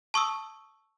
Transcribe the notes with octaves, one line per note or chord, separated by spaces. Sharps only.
A5 C#6 D#6 E6